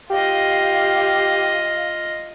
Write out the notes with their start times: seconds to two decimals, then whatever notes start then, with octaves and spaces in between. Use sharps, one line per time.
0.11 F4 G4 D#5 F5